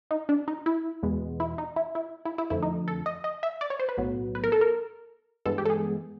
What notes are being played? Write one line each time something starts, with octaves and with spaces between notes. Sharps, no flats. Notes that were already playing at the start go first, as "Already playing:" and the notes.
D#4
D4
D#4
E4
E2 B2 G#3 B3
E4
D#4
E4
E4
E4
E4
F2 D3 F3 A3 E4
D#4
A4
D#5
D#5
E5
D5
C#5
C5
B4
B1 A2 F#3 B3
B4
A#4
A4
A#4
G2 E3 G#3 B3 A4
G4
A4
G#4